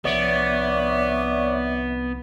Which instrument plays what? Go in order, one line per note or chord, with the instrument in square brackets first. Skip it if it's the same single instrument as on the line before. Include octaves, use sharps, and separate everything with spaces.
[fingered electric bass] C2 F3 [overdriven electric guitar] B3 [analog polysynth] C#5 D5 [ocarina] E5